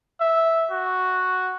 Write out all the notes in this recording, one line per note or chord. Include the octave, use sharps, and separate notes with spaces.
E5
F#4